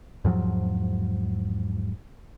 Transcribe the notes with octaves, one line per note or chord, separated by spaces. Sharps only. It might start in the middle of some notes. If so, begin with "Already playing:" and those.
E2 G#2 F3 F#3